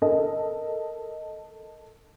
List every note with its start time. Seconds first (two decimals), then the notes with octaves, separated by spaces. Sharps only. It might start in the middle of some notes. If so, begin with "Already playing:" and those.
0.02 A4 A#4 D#5